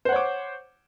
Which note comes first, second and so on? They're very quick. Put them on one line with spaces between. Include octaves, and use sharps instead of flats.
C5 F#5 C#5 D6